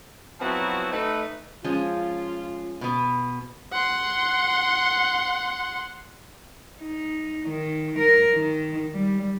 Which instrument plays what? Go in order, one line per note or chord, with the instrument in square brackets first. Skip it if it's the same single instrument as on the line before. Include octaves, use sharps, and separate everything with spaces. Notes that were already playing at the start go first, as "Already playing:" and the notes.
[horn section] F3 F#3 B3 C4 E4 F#4
A3 D#4 B4
[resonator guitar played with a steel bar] F3 G#3 C#4 [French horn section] F4
[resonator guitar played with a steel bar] B2 B3
[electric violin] F#5 C6
[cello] D#4
D#3
A#4
D#3
G3